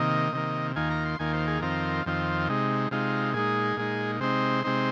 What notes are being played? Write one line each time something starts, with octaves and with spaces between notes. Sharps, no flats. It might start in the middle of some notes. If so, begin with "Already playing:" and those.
Already playing: C3 D#3 A#3 D#5
C3 D#3 A#3
D#2 D#3 A#3 F4 G#5
A#5
C6
D#2 D#3 A#3 F4 G#5
C5
G#4
F2 D#3 C4 F4 A#4
F2 D#3 C4 F4
C3 G#3 D#4
C3 G#3 D#4 F4
A#2 G#3 D#4 G#4
A#2 G#3 D#4
C3 G#3 C4 D#4 C5
C3 G#3 C4 D#4